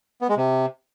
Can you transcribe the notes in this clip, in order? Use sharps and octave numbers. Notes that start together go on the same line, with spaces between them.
B3
G#3
C3